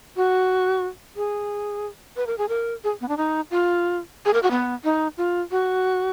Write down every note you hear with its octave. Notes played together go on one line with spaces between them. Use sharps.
F#4
G#4
B4
A#4
G#4
A#4
G#4
B3
D4
D#4
F4
G#4
A#4
F#4
B3
D#4
F4
F#4